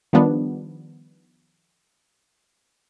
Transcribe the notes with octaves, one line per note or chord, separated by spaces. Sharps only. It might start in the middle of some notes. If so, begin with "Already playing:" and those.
D#3 F3 G3 B3 D4